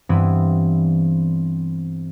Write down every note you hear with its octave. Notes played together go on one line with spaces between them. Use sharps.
G2 E3 B3 C4 E4